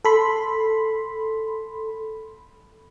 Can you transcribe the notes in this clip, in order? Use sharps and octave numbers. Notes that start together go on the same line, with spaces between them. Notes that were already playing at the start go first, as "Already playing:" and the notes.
A4 B5 C6